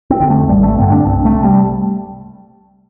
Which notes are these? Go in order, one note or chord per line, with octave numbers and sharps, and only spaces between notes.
C4
F2 D3
A3
A1 G3
A3
G2 D3 C4
D4
C2 C4
A3
C3
G3